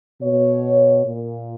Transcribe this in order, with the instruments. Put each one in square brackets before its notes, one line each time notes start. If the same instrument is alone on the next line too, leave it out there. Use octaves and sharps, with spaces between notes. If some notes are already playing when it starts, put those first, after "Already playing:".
[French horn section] B2 C#5
A#2